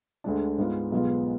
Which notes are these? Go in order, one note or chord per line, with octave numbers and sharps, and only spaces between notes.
D2 D3 G#3 D4
G#2 G#3 B3 F4
B1 B2 G#3 B3 F4